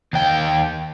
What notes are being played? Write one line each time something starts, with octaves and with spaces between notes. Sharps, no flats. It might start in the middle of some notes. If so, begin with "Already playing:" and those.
D#2 G5